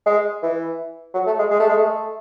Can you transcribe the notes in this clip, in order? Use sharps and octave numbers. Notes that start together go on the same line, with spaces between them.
G#3
E3
F#3
A3
G#3
G#3
A3
G#3
A3